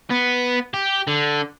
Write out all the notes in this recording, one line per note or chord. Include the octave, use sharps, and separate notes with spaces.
B3
G4
D3